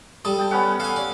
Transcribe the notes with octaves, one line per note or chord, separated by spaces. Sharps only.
G3 A4 D#6
G5 A5
B3 C#4 F#5
A4 F5 G#5
D5